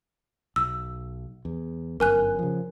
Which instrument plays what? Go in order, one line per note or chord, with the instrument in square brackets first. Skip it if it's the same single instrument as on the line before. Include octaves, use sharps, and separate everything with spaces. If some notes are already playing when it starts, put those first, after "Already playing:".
[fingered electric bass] B1 [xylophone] E6
[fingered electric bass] E2
[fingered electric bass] G1 F#2 [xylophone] A#4 G#5 F#6
[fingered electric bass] C#3 F3